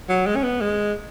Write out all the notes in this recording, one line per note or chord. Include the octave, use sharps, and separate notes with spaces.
F#3
G#3
C#4
B3
G#3